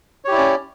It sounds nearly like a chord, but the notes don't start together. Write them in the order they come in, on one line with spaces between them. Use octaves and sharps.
C#5 G4 E4 D5 C#4